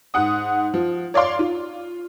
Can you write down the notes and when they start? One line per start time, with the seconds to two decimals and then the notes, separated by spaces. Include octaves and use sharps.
0.14 G#2 F#5 D#6
0.74 F3
1.14 C#5 D5 F5 C6 D6
1.39 F4